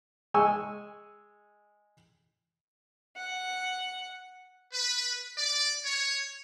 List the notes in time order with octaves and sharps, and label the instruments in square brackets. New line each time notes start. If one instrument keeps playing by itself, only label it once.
[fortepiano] G#3 G#5 C#6 E6
[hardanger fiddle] F#5
[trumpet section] B4
D5
C#5